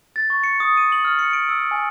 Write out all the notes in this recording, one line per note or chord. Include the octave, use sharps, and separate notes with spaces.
A6
C#6
C#7
D#6
D#7
F#7
F6
C#7
D7
E6
G#5